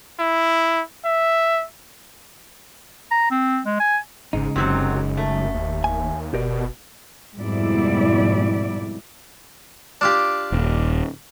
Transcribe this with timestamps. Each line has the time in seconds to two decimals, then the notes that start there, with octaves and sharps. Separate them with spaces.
0.20 E4
1.05 E5
3.11 A#5
3.31 C4
3.66 G#3
3.80 G#5
4.33 G1 G#2 C#3 G#3 D#4
4.56 F1 F#2 C3 F#3 C4
5.17 A3
5.54 D#2
5.84 D#2 G#5
6.34 F#1 B2 G4 A#4 D5
7.38 F2 G#2 B2 G3 E4 D5
10.01 D4 F4 G4
10.52 D#1